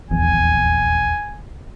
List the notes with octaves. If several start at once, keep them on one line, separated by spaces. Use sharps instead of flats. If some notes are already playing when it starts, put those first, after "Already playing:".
D#1 A#1 E2 G#5